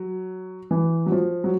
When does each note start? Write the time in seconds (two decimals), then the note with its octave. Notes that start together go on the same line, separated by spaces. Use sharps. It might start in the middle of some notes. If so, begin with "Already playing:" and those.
Already playing: F#3
0.71 E3
1.06 F#3
1.12 F3
1.44 F#3